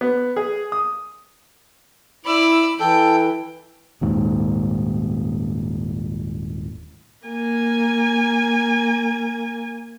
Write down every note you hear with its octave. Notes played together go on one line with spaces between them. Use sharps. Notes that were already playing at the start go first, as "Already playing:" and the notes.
B3
G#4
D#6
E4 D5 B5 E6
E3 A4 G5
D#1 D#2 G#2
A#3 G#5